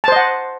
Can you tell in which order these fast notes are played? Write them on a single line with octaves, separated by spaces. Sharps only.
A5 C5 D#5 F#5